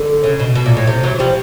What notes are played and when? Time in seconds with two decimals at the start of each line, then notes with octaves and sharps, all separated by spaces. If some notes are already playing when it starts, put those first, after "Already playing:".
Already playing: D3
0.24 C#3
0.39 B2
0.55 B2
0.66 A#2
0.77 A2
0.87 C3
1.03 E3 F#3
1.19 F3 G3